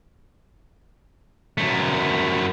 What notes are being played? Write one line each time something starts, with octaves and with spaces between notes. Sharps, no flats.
F#2 A3